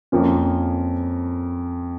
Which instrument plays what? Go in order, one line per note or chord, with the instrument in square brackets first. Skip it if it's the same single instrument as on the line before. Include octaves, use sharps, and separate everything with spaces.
[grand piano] F2 F3 A#3 C#4